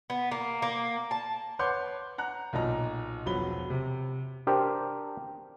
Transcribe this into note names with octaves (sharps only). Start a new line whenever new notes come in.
B3
A#3
A#3
A5
B4 C#5 F#5 C6 D6 G6
F#5 A#5 F#6
B1 A#2 D#5 A#5
E1 F3 F#3 B5 G7
C3
D4 G4 A#4 C5 G5